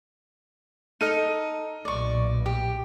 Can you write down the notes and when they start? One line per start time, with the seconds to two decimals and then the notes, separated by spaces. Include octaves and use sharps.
1.01 D#4 A4 D#5 F6 D#7
1.85 B1 A#2 D5 C#6
2.46 G4